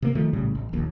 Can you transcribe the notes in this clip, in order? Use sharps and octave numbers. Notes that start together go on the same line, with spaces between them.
C3 A#3
D#3 F3 A3
A#1 A2 C#3 G3
A1
D#1 A#1 D#2